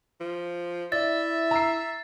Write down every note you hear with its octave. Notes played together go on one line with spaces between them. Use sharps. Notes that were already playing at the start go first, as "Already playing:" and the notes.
F3
E4 D5 E5 A6
A#5 E6 C7